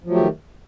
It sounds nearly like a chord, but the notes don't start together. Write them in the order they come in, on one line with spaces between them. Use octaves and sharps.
F3 F#3 A3 G4 D#3